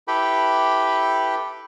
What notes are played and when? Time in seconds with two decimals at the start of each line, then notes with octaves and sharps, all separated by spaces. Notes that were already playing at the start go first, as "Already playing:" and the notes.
0.08 E4 G4 A4 B4 G5 B5